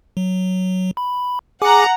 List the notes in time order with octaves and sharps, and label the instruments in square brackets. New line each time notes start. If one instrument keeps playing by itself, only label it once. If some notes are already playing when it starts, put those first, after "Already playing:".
[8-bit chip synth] F#3
B5
[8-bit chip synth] G#4 G#5 D6 [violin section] F#5 A#5